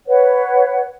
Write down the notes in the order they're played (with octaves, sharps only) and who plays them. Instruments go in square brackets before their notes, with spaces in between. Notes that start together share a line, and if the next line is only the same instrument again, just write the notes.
[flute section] B4 C#5 F#5